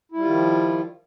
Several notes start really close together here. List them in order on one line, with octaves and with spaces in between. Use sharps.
E4 G3 F4 D#3 F3